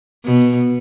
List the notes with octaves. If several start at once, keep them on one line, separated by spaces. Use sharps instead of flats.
B2